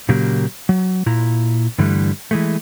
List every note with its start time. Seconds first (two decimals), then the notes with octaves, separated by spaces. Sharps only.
0.09 A#2 C#3 F#3 A#3 G4
0.69 F#3
1.06 A#2 E4 A#5
1.78 G2 D3 E3 G3 A3
2.31 E3 G#3 A3